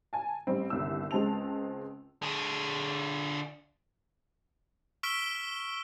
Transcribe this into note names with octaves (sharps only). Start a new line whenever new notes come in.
G#5 A5
A1 G3 C4
G1 C2 D#3 E6
C#2 G#3 C4 A5 F7
D3 G#4
C#6 E6 F6 B6 D7 G7